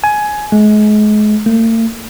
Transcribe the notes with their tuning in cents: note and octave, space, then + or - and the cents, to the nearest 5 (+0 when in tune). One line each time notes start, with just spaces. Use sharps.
G#5 +15
G#3 +35
A3 +45